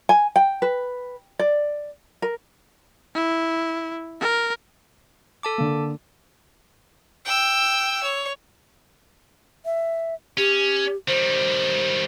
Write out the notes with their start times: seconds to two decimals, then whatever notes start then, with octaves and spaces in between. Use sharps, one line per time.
0.09 G#5
0.36 G5
0.62 B4
1.39 D5
2.22 A#4
3.15 E4
4.20 A#4
5.43 A4 A5 D6
5.58 D3 A#3
7.25 G5 E6
8.03 C#5
9.65 E5
10.38 C#4 G4
11.08 D#3 G3 C5